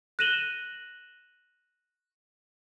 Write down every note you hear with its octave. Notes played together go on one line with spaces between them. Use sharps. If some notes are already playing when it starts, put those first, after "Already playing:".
F#6 A#6 D#7 E7 F#7 G7